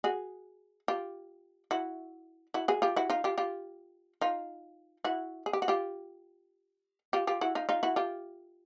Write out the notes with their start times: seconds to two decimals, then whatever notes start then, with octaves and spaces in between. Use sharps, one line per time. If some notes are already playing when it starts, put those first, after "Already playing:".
0.04 F#4 G#4
0.88 F4 G4
1.71 E4 F#4
2.54 E4 F#4
2.68 F#4 G#4
2.82 F4 G4
2.96 E4 F#4
3.10 D#4 F4
3.24 F4 G4
3.38 F4 G4
4.21 D#4 F4
5.04 E4 F#4
5.46 G#4
5.53 G4
5.62 F#4
5.68 F4 G4
7.13 F4 G4
7.27 F4 G4
7.41 E4 F#4
7.55 D#4 F4
7.69 D#4 F4
7.83 E4 F#4
7.96 F4 G4